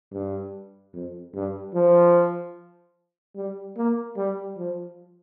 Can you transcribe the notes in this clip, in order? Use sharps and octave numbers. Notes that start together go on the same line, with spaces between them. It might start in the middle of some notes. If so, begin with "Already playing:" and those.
G2
F2
G2
F3
G3
A#3
G3
F3